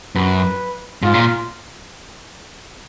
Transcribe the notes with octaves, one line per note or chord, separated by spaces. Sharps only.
F#2 B4
G#2 F4
A#2